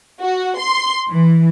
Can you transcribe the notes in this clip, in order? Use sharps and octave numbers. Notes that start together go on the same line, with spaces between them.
F#4
C6
E3